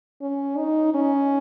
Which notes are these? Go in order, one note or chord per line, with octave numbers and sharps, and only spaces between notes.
C#4
D#4
C#4